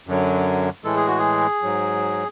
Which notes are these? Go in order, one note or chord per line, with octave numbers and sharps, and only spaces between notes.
F#2 D3 F#3
A2 E3 G#3 A4
G#4
F#4
G#4
G#2 F#3